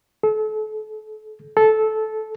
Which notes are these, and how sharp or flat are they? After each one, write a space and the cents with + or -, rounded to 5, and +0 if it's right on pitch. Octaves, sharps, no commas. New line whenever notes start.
A4 -35
A4 -15